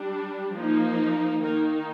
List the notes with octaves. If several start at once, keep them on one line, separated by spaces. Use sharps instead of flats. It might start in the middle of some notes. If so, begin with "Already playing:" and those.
Already playing: G3 D4
F3 A#3 D#4
D#3 A#3 D#4 A#4